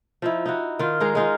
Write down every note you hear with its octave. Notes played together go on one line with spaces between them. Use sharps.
F3 D#4 E4
D#4 E4 F#4
D#3 F4
G#3 D#4 A#4 F5
G#3 D#4 F4